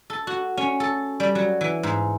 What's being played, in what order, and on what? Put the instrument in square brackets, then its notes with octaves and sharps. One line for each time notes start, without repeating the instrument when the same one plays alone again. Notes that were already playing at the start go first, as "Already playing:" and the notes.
[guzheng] A4
F#4
C#4
A4
G3
F#3
E3
G#2